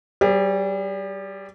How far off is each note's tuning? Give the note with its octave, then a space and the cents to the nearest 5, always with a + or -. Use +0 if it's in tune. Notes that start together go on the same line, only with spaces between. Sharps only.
G3 -25 G4 +45 C5 +0